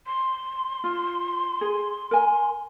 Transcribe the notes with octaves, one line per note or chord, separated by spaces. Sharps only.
C6
F4
G#4
A#4 G#5